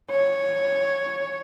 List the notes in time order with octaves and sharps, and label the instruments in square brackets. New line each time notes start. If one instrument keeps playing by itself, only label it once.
[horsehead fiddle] C#5